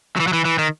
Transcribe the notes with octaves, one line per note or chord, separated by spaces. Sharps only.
F#3
E3
F#3
E3
E3
D#3